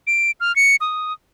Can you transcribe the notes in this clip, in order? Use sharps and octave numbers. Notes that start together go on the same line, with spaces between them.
D7
F6
C#7
D#6